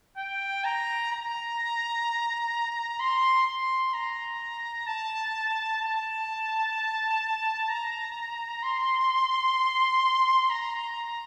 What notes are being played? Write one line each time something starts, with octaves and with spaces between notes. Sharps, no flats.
G5
A#5
A#5
C6
C6
A#5
A5
A5
A#5
C6
A#5